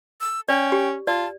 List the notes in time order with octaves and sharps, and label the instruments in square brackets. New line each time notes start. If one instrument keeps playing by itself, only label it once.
[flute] E6
[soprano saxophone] C#4 [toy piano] D5 [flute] G5
[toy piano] G4
[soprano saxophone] F4 [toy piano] D5 [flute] A5